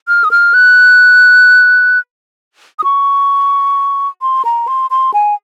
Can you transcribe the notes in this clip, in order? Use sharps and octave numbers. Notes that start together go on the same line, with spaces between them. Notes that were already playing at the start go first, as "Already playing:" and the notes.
F6
D#6
F6
F#6
D#6
C#6
C6
A#5
C6
C6
G#5